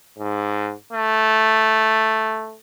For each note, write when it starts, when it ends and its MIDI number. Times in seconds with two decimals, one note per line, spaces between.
0.19 0.73 44
0.93 2.56 57